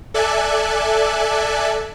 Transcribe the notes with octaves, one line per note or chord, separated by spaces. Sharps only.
A4 D5 E5 G#5 F#6